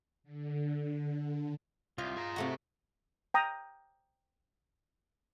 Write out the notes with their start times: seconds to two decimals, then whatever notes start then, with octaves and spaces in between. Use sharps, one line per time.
0.24 D3
1.98 C2 F4 D#5
2.17 G#4 A#5
2.36 C3 A3 F#4
3.34 G5 A#5 D#6